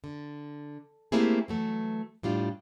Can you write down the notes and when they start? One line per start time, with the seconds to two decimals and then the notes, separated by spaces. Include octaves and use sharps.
0.04 D3
1.12 A3 A#3 C4 E4 G4 G#4
1.48 E3 F#3 A3
2.23 A2 G3 D4 F4